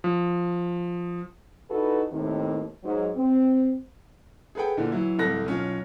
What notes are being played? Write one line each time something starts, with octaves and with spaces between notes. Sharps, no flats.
F3
E3 D#4 F#4 A4 B4
D#2 A2 C3 D#3
G#2 F#3
C4
G#4 A4 B4 F#5 G5
A#2 D3 E3
E3 F#3 E4
D1 C2 A4 F#6 A#6
B1 C#4 F4